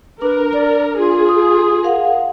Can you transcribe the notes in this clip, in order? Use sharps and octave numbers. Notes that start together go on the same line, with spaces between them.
D4 A#4 B4
D5
F4 G#4
D#6
A#4 F5 F#5